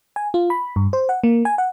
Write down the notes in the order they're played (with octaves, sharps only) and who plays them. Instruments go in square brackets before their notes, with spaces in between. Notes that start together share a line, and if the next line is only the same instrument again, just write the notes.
[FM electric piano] G#5
F4
B5
G2
C5
F#5
A#3
G#5
F#5